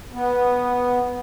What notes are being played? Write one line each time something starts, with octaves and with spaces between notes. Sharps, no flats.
B3